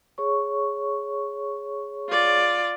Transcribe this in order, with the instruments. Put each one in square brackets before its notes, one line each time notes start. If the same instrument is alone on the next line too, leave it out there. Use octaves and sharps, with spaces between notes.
[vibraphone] G#4 C#5 C#6
[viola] F4 D5